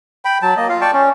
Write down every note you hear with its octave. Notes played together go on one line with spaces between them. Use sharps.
G5 B5
F#3 A5
A#3 D#5
F4 F5
D5 G5 A5 C#6
C#4